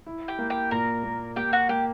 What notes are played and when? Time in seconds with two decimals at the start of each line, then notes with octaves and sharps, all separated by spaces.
0.06 E4
0.28 G4 G5
0.39 A#3
0.50 G4 G5
0.71 A#2 A#4 A#5
1.03 A#3
1.36 A#3 G4 G5
1.53 F#4 F#5
1.69 A#3 G4